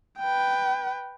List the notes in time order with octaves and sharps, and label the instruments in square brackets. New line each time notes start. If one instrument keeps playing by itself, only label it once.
[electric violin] B4 G5